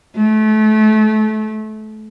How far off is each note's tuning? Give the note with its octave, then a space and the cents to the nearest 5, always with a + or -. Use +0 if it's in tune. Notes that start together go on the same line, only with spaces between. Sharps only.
A3 -30